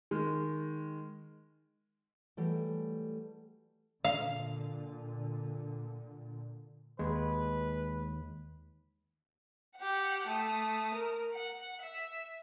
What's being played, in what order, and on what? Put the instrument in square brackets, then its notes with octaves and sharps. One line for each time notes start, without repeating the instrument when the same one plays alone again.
[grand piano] D#3 G#3
[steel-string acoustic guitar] E3 F#3 G3 A3
[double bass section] A#2 D3 [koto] F5
[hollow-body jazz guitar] D#2 [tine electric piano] G#3 [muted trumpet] B4
[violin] G4 F#5
A3 D#6
A#4
F#5
E5